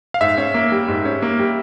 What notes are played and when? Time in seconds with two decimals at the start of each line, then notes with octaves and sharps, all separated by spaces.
0.14 F5
0.21 G#2 E5
0.38 C#4
0.54 A#3
0.72 G3
0.88 G#2
1.05 C#4
1.22 A#3
1.39 G3